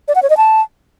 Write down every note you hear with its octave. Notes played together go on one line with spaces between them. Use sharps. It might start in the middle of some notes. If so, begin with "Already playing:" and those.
D5
F#5
C#5
D#5
A5